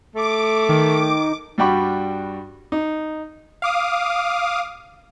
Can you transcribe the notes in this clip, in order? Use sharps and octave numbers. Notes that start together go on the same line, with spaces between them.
A3 D6
D#3
G2 G3 F#4 G5 B5 C#6
D#4
F5 D6 D#6